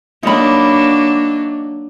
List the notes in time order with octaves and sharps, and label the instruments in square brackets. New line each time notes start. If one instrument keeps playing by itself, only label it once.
[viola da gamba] F#3 A#3 D4 [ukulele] D#4 B5